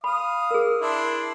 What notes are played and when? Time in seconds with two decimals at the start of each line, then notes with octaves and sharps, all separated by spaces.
0.04 F5 B5 D#6
0.51 G#4 A#4
0.81 D4 E4 C6